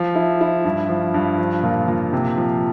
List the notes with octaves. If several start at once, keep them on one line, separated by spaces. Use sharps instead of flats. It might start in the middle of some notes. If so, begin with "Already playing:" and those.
Already playing: F3
E4
E4
G2
F3
G2
F3
A#2
A#2
C3
F3